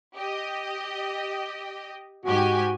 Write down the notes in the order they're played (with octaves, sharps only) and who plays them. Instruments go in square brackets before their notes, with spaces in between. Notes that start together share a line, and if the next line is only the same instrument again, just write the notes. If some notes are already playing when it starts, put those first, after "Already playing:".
[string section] G4 D#5
[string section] G#2 G4 G#5 [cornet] F#4